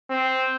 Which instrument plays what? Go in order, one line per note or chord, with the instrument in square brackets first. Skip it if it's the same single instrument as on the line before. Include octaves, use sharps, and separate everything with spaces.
[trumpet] C4